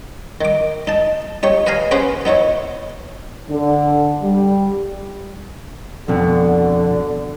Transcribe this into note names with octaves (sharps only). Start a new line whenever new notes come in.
D#3 D6
D#4 A5
D#4 G4 C#5
B4 D#5 F5 G#5 A#5
B3 C#4 G#4 B4 C5
B3 D#4 E4 C#5
D3
G3
F2 B2 D3